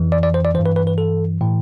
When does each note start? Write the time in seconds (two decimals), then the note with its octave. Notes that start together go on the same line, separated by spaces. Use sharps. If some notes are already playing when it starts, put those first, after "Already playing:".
Already playing: F2 E3
0.12 D5
0.23 D5
0.34 C5
0.45 D5
0.55 E3 C5
0.59 G2
0.66 B4
0.76 B4
0.87 B4
0.98 A4
1.41 A2 E3